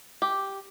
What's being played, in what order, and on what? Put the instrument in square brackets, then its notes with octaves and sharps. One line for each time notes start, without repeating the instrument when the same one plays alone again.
[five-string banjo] G4